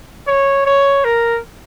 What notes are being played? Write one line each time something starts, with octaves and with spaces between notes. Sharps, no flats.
C#5
C#5
A#4